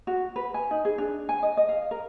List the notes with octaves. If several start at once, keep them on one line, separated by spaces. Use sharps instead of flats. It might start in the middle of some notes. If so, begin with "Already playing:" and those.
F#4
B4
G#5
D#4
G#4
D4
G#5
D#5
D#5
F5
A#4